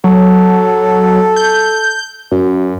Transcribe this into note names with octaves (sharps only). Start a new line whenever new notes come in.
F#3 A4
G6
F#2